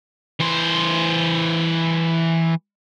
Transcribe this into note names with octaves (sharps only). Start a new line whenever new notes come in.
E3 C5